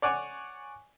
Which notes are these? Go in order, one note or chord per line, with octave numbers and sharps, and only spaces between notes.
C#5 D5 F#5 G#5 C#6